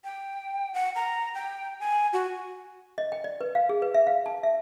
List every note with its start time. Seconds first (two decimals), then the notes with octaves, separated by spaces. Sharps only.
0.04 G5
0.74 F#5
0.95 A#5
1.34 G5
1.80 G#5
2.13 F#4
2.98 D#5
3.12 G5
3.24 D5
3.41 B4
3.55 F5
3.69 G#4
3.82 B4
3.94 E5
4.07 F5
4.26 A5
4.43 E5